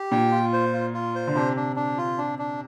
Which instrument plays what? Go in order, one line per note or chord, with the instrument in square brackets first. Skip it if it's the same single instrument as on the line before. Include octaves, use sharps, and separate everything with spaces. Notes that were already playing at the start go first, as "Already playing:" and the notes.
Already playing: [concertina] G4
[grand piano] A#2 [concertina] G5
[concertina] F4
C5
F4
F4
C5
[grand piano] D3
[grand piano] C3 [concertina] D4
[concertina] D4
D4
F4
D4
D4